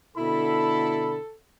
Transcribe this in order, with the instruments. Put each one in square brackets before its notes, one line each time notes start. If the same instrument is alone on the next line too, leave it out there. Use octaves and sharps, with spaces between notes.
[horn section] B2 D3 B5 [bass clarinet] E4 [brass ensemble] A4